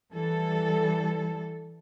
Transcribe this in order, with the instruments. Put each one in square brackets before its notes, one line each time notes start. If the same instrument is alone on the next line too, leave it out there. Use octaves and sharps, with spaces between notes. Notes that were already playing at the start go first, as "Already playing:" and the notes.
[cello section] E3 G3 A4